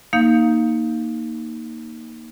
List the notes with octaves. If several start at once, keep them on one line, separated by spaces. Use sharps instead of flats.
A#3 D#4 F5 G6